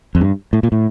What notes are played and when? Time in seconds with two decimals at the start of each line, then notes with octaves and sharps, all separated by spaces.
0.15 F2
0.21 G2
0.53 A2
0.63 A#2
0.72 A2